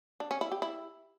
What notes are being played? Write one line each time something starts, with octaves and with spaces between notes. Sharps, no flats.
D4
C#4
E4
G4
E4